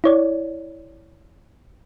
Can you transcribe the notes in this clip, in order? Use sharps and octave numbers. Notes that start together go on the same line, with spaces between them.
E4 C#5 D5